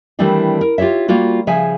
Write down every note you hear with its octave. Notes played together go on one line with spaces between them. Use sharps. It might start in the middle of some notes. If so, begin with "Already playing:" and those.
D#3 E3 G3 A3 C4 D4
A#4
F4 G4 A4 C#5 E5
G3 A#3 F4 F#4
C#3 F3 G#4 E5 G#5